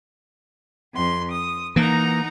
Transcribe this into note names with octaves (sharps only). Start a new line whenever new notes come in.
F2 C6
D#6
E3 A#3 D#4 F#5 A#5